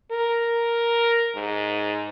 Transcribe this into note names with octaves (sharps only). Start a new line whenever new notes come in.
A#4
G#2